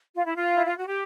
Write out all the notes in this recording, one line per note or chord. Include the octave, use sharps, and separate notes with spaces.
F4
E4
F4
E4
F4
F#4
G4